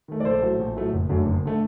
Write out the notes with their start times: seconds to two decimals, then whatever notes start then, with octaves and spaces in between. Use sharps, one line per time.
0.08 D#3 A3
0.20 D5
0.25 A#1 A4 C5
0.42 A2 F#3 A3
0.59 A#1
0.76 A2 F#3 A3
0.92 F#1
1.09 F#2 D3 A3
1.26 F#1
1.45 D3 A3